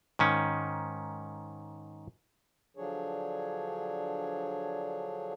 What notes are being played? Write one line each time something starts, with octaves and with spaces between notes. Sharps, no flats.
G#2 D#3 C#4
D3 F3 F#3 D4 G#4 C#5